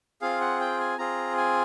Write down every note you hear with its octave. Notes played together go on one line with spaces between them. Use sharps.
C4 F4 G#4 F5
F#5
G5
G#5
C4 F4 G#4 A#5
G#5